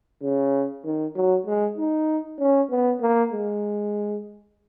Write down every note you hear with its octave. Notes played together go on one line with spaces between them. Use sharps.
C#3
D#3
F#3
G#3
D#4
C#4
B3
A#3
G#3